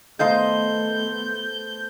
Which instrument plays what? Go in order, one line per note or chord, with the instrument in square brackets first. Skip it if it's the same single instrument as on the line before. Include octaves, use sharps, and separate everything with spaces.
[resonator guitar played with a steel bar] D#3 D#5 F5 [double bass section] A3 B3 [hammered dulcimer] A4 C5 [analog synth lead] G6